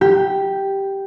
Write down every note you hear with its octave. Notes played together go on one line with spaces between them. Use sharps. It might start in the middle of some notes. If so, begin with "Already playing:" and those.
G4